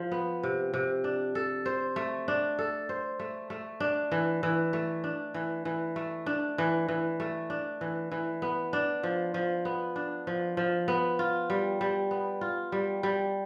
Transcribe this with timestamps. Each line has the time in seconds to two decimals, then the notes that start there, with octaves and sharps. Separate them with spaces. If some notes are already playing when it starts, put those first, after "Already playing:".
Already playing: F3
0.11 B3
0.43 C3
0.74 C3
1.04 D4
1.35 A4
1.66 C5
1.96 A3
2.28 D4
2.59 A4
2.89 C5
3.19 A3
3.50 A3
3.80 D4
4.11 E3
4.43 E3
4.73 A3
5.04 D4
5.34 E3
5.65 E3
5.96 A3
6.26 D4
6.58 E3
6.88 E3
7.20 A3
7.50 D4
7.81 E3
8.11 E3
8.42 B3
8.73 D4
9.03 F3
9.34 F3
9.65 B3
9.96 D4
10.27 F3
10.57 F3
10.88 B3
11.19 F4
11.50 G3
11.81 G3
12.11 B3
12.41 F4
12.72 G3
13.03 G3